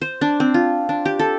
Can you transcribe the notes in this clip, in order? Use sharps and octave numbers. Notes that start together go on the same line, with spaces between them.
C5
D4
C4
F4
D4
G4
A4